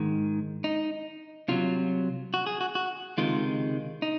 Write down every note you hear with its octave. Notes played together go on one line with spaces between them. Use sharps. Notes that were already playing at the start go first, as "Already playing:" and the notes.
Already playing: G#2 D#3 G#3
D#4
C2 C3 F#3 F4
F#4
G#4
F#4
F#4
C#2 C3 D#3 G#3 F4
D#4